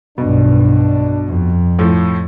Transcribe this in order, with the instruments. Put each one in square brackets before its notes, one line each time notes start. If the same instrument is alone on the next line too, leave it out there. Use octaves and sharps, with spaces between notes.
[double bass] B1 G2 [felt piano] B2 [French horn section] D4
[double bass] F2
[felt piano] A2 F3